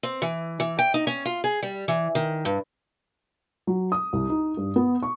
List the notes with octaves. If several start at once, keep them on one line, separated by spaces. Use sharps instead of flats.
C4
E3
E3
G5
D#4
C#4
F4
G#4
G3
E3
D#3
G2
F#3
D#6
C2
D#4
G2
B3
C#6